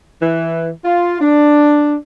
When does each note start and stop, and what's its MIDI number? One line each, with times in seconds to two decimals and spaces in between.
0.22 0.70 52
0.85 1.20 65
1.20 1.96 62